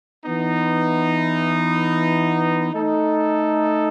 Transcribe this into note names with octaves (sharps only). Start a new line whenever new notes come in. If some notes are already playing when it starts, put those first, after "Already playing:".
E3 B3 D#4
A3 D#4 A4